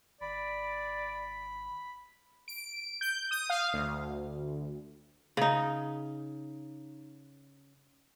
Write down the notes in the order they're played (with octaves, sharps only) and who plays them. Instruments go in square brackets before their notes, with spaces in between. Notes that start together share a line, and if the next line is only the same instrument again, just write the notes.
[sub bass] G#1 [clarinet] D5 [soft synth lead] B5
[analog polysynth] D7
G6
D#6
F5
D2
[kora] C#3 D#4